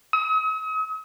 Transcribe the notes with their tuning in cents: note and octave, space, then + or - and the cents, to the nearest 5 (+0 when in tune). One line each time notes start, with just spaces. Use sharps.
D#6 +45